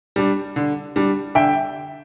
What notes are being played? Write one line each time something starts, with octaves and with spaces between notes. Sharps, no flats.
G3 D4
D3
G3 D4
D3 E5 G5